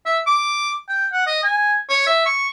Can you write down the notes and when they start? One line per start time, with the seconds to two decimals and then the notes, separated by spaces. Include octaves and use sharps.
0.06 E5
0.27 D6
0.89 G5
1.13 F#5
1.27 D#5
1.44 G#5
1.90 C#5
2.07 E5
2.26 C#6